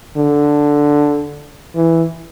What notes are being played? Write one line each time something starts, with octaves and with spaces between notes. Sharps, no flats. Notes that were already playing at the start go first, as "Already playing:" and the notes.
D3
E3